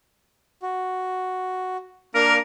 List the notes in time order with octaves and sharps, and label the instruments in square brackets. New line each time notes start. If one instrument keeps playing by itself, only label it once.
[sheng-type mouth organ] F#4
[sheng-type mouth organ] A#3 D4 F5 [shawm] A#4